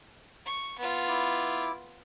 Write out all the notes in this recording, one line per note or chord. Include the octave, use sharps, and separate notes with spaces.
C#6
B3 F4
E4 D6